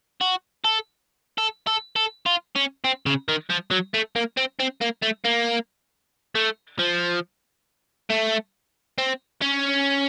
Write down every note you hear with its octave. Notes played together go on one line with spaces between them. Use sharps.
F#4
A4
A4
A4
A4
F4
C#4
C4
C#3
D#3
F3
F#3
A3
A#3
C4
C4
A#3
A3
A#3
A3
F3
A3
C4
C#4